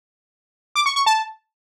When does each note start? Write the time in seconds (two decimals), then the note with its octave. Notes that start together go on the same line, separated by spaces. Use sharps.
0.76 D6
0.86 C#6
0.96 C#6
1.06 A5